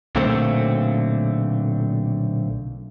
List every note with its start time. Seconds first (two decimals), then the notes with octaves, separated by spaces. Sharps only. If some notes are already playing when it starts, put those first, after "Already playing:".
0.15 B1 A#2 D3 A3 C4